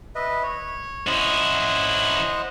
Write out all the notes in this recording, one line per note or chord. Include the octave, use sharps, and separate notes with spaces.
B4 D#5 E5
C#5
C#4 E4 C5 D#5 F#5